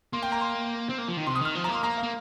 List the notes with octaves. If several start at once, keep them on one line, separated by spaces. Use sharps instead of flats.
A#3 C6
G5
A#5
C6
C4
A#3
F3
D#3
C3 C6
D#6
D#3 F6
F3
A#3 A#5
C6
A#3 A#5
F5
A#3